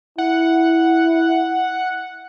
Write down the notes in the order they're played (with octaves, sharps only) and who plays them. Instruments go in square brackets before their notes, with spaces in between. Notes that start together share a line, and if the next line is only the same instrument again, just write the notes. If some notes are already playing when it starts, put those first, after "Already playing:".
[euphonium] E4 [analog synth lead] F#5